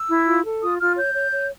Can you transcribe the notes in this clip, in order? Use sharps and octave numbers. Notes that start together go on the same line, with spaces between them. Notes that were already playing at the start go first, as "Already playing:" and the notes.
Already playing: E6
E4
F4
A4
F4 D#6
F4 F6
C#5 G6
C#5
C#5